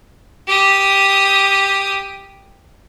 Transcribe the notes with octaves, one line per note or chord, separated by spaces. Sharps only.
G4 D#6